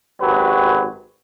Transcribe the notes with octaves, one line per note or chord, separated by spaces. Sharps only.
G#1 F#2 F#3 G4 B4